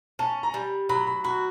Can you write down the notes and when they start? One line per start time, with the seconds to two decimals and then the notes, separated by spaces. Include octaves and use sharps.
0.19 C#4 A5
0.43 A#5
0.54 G3
0.89 F#3 B5
1.07 B5
1.24 F#4 B5